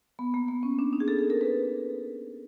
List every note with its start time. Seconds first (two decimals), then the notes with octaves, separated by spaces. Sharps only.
0.19 B3
0.34 A#3
0.48 B3
0.63 C#4
0.79 D4
0.93 D#4
1.00 G#4
1.08 A4
1.19 A4
1.30 A#4
1.41 B4